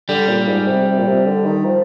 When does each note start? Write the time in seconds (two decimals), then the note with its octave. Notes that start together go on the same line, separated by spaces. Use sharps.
0.09 D3 G3
0.28 A#2
0.48 G#2
0.67 C3
0.87 C3
0.99 A#2
1.07 C3
1.26 D3
1.45 D#3
1.65 F3